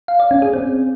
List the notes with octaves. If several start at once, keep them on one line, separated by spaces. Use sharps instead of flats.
F5
D5
C#4
G#4
C4